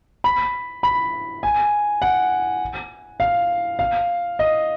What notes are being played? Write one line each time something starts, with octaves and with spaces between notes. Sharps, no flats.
B5
B5
G#5
F#5
F5
F5
D#5